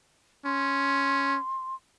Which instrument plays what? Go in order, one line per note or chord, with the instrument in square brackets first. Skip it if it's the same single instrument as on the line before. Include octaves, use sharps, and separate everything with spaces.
[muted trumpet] C#4 [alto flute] C6